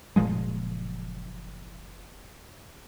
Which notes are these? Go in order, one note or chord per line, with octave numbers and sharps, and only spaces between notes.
F#1 A#2 F3 G#3